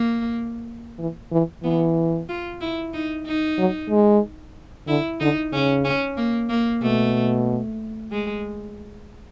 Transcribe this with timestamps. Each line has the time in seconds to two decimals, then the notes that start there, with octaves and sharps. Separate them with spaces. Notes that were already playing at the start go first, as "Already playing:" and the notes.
Already playing: A#3
0.99 E3
1.32 E3
1.64 E3 B3
2.29 F4
2.61 E4
2.93 D#4
3.26 D#4
3.58 F#3
3.90 G#3
4.88 D3 E4
5.20 D3 D#4
5.52 C#3 C#4
5.84 C#4
6.17 A#3
6.50 A#3
6.82 B2 A3
8.12 G#3